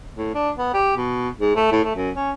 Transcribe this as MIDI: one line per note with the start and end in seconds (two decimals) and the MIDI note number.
0.16 0.31 45
0.35 0.50 62
0.58 0.74 59
0.74 0.94 67
0.97 1.29 47
1.40 1.52 44
1.56 1.72 57
1.72 1.82 45
1.84 1.94 57
1.95 2.10 42
2.15 2.31 61